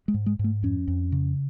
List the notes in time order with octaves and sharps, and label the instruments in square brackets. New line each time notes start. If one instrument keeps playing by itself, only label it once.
[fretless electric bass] G#3
G#2
G#3
G#2 A3
F2 C#4
F2
C#3